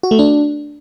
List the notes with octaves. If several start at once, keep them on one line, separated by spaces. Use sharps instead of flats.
F#4
A3
D4